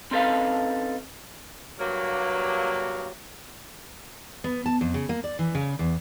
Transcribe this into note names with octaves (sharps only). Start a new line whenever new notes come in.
C4 C#4 D#4 A4 B4 F5
G2 F#3 A#3
B3
A5
F2
C#3
A#3
D5
E3
C#3
E2